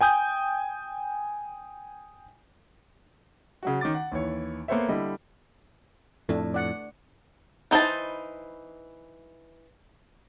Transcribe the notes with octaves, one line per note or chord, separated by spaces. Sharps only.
G5 G#5 D#6 G6
C#3 F#3 F#4
D#3 C#4 D6 A6
F#5
D#2 E3 C#5
A#3 B3 A4 C5 C#5 E5
D3 G3 E4 D#5
F2 A2 A3 D4
D5 F#5
E3 D#4 C5 A5